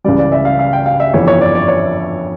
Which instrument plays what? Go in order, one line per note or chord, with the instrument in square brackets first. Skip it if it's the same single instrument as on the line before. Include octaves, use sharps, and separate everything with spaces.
[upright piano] C#2 C#3 E3 G3 D5
D5
E5
F5
F5
G5
F5
E5
G1 F2 E3 C#5
C#5
D5
D5
C#5